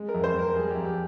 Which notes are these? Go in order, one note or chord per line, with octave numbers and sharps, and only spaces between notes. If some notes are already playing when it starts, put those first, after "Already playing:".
Already playing: G#3
A#4
F2
C5
F2 A#4
G3 G#4
F2 G4
G4